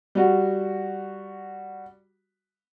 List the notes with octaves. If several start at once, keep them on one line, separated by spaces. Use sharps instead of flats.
G3 F#4